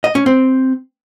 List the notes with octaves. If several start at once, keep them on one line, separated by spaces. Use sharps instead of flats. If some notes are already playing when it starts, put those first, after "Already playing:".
D#5
C#4
C4